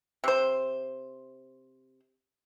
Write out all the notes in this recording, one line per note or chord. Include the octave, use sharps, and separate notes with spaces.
C3 C5